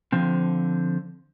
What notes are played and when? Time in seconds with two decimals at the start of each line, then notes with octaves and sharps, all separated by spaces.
0.12 D3 F3 C4